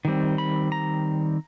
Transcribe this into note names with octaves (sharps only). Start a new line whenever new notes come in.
D#3 G3 C4
B5
A#5